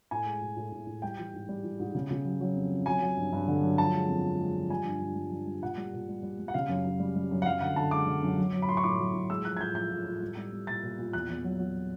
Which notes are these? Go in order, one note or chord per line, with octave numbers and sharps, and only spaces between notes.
A2 G#5
G#3
A2
A2
A2
A2
G3 G5
E3
G#2
G3
E3
G#2
C#3
C#3
F#3
F#3
F2
F2
F#3 G#5
F#3
G2
G2
D3
F#3
F3 A5
G#3
F2
F2
G#3
F3
G3 G#5
G2
G2
G3
G2
G3
A#2 F#5
G3
A#2
G3
G3
G3
F#5
C#3 F5
F#2
F#2
G3
G3
F#2
F#5
F#2 F5
D3 F#5
D3 A5
G#3 D6
D3
F#2
F#3
F#3
B5
A2 C6
C#6
A2 D6
F#3
A2
G#3 E6
F3 F#6
G#6
A2 G6
F3 G6
A2
A2
G3
G3
G3
A#2 A6
A#2
A#2
E2 F#6
E2
F#3
F#3